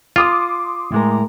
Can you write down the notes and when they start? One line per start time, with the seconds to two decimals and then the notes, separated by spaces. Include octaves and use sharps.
0.16 F4 C6 D6 D#6
0.92 A2 G#3 A#4